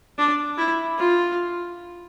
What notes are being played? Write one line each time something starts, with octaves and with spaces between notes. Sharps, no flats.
D4
E4
F4